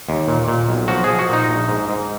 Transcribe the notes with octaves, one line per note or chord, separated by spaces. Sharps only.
D#2
A#2
A#2
B1
F3 F#4
F3 G#4
F#4
A#2 D#4
A#1
G#2
G#2